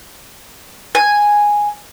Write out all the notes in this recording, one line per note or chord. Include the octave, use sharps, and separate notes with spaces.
G#5